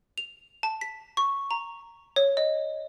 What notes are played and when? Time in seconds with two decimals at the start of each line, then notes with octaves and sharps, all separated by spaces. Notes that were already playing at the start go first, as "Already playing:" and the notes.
0.18 F7
0.63 A5
0.81 B6
1.17 C#6
1.51 A#5
2.16 C#5
2.37 D#5